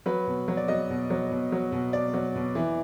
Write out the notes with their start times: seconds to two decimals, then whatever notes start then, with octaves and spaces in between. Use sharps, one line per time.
0.06 F#3 B4
0.27 B2
0.48 F#3
0.57 D5
0.68 F#3 D#5
0.90 B2
1.10 F#3
1.31 B2
1.52 F#3
1.72 B2
1.93 B2 D5
2.14 F#3
2.36 B2
2.55 E3